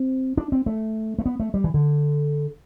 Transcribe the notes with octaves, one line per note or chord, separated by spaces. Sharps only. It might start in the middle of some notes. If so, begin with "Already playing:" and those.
Already playing: C4
D4
C4
A3
A3
B3
A3
G3
E3
D3